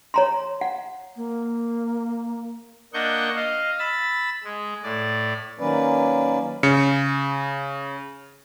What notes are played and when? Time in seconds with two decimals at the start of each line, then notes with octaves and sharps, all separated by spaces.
0.14 C#5 A#5 C6
0.61 F#5
1.16 A#3
2.94 A#3 D4 D#5 F#5 C#6 G6
3.36 D#5 F5
3.79 B5 E6 A6
4.44 G#3
4.83 A2 D5
5.60 D#3 F#3 A#3 C#4 B4 D5
6.63 C#3 C#7